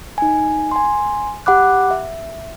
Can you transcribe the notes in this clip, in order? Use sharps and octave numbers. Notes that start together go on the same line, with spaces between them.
D#4 G#5
G#5 C6
G4 F#5 B5 D6 F#6
E5